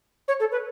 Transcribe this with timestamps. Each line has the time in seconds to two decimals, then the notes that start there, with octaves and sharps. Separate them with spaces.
0.28 C#5
0.40 A4
0.51 B4